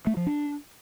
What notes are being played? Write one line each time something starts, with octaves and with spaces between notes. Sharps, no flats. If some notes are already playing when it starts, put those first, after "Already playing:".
A3
F3
D4